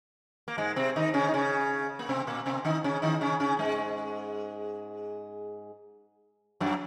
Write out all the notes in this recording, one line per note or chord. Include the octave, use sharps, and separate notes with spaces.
A#3
G#2 G#3
C3 C4
D#3 D#4
C#3 C#4
D#4
C#3 C#4
A#3
C3 C4
A#2 A#3
C3 C4
D#3 D#4
C#3 C#4
D#3 D#4
C#3 C#4
C#3 C#4
G#2 G#3
F#2 F#3